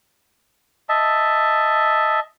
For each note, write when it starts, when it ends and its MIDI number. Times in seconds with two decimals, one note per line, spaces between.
0.89 2.20 75
0.89 2.20 76
0.89 2.20 81